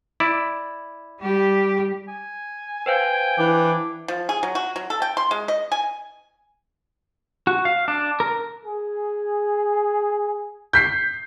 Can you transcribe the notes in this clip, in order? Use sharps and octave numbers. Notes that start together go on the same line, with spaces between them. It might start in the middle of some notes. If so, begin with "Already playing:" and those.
E4 D5
G3 G4
G#5
B4 C5 F5 G5
E3 D4
F3
G#4
F#3
F#4
F#3
A4
G5
C6
G#3
D#5
G#5
F#4
F5
D4
A#4
G#4
G6 B6 C7